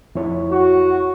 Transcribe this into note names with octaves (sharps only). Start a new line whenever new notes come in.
F2 E4 C#5
F#4